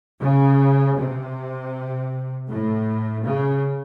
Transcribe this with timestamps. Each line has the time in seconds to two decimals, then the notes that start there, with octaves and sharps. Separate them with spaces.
0.21 C#3
0.98 C3
2.49 A2
3.25 C#3